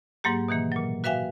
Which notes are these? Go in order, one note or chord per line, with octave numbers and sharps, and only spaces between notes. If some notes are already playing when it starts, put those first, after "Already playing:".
G#2 F#3 A#3 G4
B2 D#3 E3 A#3
A#2 F#3
F#4 B4 E5 F5 G5 G#5